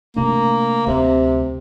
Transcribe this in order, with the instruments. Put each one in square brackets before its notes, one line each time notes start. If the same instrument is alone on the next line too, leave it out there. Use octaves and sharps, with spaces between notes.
[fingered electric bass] C3 A3 D4 [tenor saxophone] A#3
[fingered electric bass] D2 C4 [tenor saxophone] C3